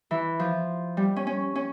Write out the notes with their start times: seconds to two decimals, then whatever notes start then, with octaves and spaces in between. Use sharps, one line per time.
0.11 E3
0.40 F3
0.97 G3
1.16 C#4
1.27 C#4
1.55 C#4